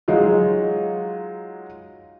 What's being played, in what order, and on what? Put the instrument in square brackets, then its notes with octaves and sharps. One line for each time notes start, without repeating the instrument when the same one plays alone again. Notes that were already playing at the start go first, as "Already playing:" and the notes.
[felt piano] F#3 G#3 D#4 F4